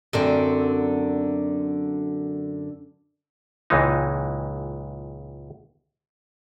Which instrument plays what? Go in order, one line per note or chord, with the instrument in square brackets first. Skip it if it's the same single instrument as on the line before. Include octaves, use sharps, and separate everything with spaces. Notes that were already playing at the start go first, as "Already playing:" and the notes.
[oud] F#2 D3 C4
[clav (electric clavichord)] C#2 A#2 E3 G#3 D#4